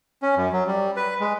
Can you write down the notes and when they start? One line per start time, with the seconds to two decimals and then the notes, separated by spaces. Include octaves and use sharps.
0.22 C#4
0.37 F#2
0.53 F#3
0.67 G3
0.96 B4
1.20 G#3